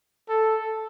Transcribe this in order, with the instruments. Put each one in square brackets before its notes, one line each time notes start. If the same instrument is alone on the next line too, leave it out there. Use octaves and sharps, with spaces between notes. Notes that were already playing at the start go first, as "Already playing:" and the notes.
[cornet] A4